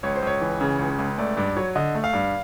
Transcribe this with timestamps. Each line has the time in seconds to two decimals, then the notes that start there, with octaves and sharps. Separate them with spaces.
0.03 C#2 C#5
0.16 C5
0.22 C#2 C#5
0.41 E3
0.61 C#3
0.79 C#2
0.99 C#2
1.18 A3 D5
1.37 G2 D5
1.57 F#3 C#5
1.75 D3 D#5
1.95 A3
2.04 F5
2.13 G2